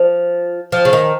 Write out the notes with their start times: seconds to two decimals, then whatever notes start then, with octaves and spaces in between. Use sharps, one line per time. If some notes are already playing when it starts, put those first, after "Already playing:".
Already playing: F3
0.72 F3
0.85 C#3
0.93 D#3